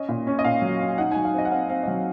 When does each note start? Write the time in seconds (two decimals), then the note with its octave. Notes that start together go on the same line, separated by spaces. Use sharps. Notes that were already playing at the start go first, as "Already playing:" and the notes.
Already playing: C#4 D#5
0.09 A#2
0.27 C#4
0.39 D#5
0.44 A#2 F5
0.62 F#3
0.80 C#4
0.98 D#4 F#5
1.12 G#5
1.16 F#3
1.25 F5
1.34 C4 D#5
1.45 F#5
1.52 C4 F5
1.70 C4 F5
1.83 D#5
1.87 F#3 F5